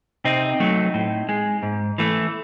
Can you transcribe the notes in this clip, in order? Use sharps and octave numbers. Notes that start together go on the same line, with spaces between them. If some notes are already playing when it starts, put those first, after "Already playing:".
C3 C4 D#4
F#3 A3
A2
G#3
G#2
E3 A3